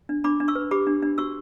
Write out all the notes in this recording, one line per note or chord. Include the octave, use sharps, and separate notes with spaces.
D4
D4 B5 D6
D4
C#6 E6
B4
G4 B5 D6
D4
D4
F#4 C#6 E6